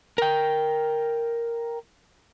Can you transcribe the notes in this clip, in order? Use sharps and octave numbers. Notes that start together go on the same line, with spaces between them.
A#4 G5